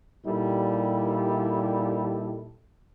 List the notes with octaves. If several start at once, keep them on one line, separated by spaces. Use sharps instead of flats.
A#2 G3 D#4 E4 G4 A4